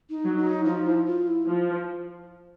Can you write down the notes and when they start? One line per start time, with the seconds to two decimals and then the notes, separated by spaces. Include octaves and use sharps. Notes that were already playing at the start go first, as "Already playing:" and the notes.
0.10 D#4
0.25 F#3
0.37 D#4
0.65 F3 D#4
0.86 E4
1.06 F4
1.27 E4
1.48 F3